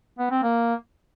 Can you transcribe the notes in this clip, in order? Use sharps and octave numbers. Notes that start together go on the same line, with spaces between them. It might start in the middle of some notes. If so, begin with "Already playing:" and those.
B3
C4
A#3